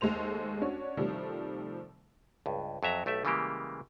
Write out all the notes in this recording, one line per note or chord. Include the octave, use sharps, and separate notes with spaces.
D#2 G#3 A3 C5 F7
C#4 D4 F#4 C#5
C3 D#3 F3 G3 A3
C#2 G2
F2 F#3 E5 A#5
B1 A3 G4 E5
C#3 E3 G3 G#3 A#3 G4